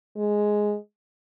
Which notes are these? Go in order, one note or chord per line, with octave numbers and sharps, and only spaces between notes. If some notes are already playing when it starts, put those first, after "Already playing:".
G#3